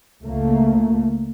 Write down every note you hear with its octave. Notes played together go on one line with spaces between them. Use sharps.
C#2 C#3 A3 A#3